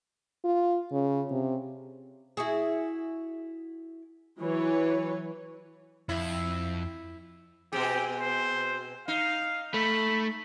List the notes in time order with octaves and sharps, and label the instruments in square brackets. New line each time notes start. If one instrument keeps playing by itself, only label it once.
[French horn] F4
C#3
C3
[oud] E4 F#4 G#4
[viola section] E3 F#3 B4 C#5
[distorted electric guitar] F2 [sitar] E4
[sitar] B2 C4 G#4 [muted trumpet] G4
[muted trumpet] C5
[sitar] D#4 [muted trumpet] F5
[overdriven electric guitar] A3 [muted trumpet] B5